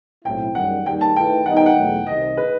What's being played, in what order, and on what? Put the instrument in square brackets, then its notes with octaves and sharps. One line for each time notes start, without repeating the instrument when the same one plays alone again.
[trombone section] B1 A2 F#3 C4 E4 [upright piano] G5
[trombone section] F#2 D#3 G3 [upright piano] F#5
[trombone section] D#2 D#3 G3 [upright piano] G5
[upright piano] A5
[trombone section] D#3 A3 E4 B4 [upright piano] G5
[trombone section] D#3 G3 B3 D#4 [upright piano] F#5
[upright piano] G5
F#5
[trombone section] E2 B2 F#3 A3
[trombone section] C2 C3 D#3 [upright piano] D#5
[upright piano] B4